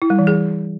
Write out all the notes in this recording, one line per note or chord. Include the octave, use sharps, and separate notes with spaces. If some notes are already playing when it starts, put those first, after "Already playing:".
E4
G3
E3
G#4